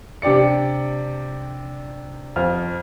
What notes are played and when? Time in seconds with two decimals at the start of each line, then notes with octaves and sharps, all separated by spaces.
0.22 C3 D4 G4 D5 C#7
2.36 F2 C5 F6